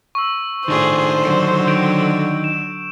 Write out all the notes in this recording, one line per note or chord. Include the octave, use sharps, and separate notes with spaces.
C#6 E6
A2 D#3 D4 F4 G#4 C5
D3 F#3
D#3 G6 D7
E7